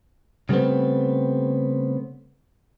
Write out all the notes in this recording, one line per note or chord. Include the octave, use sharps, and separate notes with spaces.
C#3 G3 A3 B3 C4